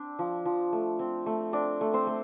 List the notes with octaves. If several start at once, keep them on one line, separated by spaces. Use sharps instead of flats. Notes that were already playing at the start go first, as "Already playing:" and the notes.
Already playing: C4 D4
F3
F3
A3
C4
A3
C4 D4 D5
A3
C4 C5
A3